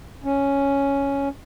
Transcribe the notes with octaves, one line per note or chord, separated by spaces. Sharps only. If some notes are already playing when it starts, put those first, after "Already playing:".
C#4